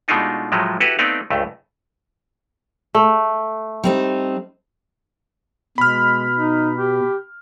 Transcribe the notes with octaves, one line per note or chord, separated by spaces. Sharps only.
B2 G#3 A3 D4 D#4 F4
A2 F3 F#3 G#3 A3
E4 F#4 G4 A4 B4
A3 B3 C4 D#4 D5 F5
C#2 G2 A3
A3
G3 C4 D#4
B2 G#3 B5 F6
D#4
G4